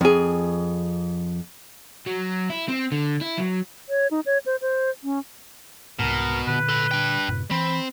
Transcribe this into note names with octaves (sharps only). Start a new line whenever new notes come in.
F2 G#4
F#3
E4
C4
D3
E4
F#3
C#5
D#4
C#5
C5
C5
C#4
C2 G#2 B2 A#4
A#2 D3 B4
A4 B5
D4 G5
F#2 A2 C3
E3 C4 B5